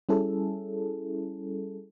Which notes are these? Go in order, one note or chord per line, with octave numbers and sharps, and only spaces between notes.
G3 C#4 E4 G#4 A4